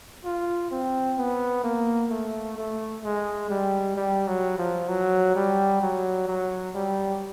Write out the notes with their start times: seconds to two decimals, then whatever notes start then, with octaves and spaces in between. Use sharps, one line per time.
0.25 F4
0.71 C4
1.18 B3
1.64 A#3
2.10 A3
2.56 A3
3.03 G#3
3.50 G3
3.96 G3
4.27 F#3
4.58 F3
4.89 F#3
5.35 G3
5.81 F#3
6.27 F#3
6.74 G3